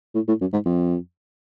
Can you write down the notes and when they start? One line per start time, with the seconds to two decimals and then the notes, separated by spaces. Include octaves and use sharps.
0.15 A2
0.28 A2
0.41 F#2
0.53 G#2
0.66 F2